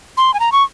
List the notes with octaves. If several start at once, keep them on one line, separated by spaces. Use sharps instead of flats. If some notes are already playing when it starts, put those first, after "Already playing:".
C6
G#5
A#5
C#6